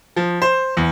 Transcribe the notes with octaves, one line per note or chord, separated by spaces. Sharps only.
F3
C5
E2